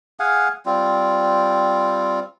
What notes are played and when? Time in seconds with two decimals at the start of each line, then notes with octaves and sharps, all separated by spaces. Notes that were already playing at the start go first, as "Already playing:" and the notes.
0.20 G#4 F5 F#5 G#5
0.66 G3 C4 F4